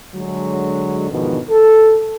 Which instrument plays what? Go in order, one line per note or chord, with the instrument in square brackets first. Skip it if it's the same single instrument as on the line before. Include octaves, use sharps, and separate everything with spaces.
[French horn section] D3 F#3 G#3
E2 G#2 B2 D3 D#3 F3
A4